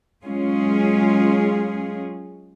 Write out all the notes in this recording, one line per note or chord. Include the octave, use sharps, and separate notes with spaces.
F#3 G#3 C#4 F4 G#4